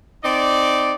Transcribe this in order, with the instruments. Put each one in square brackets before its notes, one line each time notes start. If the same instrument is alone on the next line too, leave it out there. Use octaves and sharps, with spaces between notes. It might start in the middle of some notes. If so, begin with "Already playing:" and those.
[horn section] C4 D#4 D5